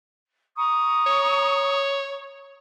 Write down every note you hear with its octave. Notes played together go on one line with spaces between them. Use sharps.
A#5 C#6 D#6
C#5